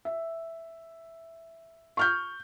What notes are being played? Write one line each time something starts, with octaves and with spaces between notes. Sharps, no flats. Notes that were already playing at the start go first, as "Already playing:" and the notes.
E5
C#6 F6 G6